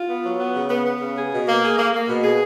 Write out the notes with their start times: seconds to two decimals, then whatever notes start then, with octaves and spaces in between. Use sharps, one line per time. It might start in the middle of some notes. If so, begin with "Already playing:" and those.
Already playing: F4
0.09 B3
0.24 F#3
0.39 B3
0.55 C#3
0.70 B3
0.85 B3
1.01 C#3
1.17 G#4
1.32 B2
1.47 A#3
1.62 G#4
1.78 A#3
1.93 A#3
2.08 B2
2.24 G#4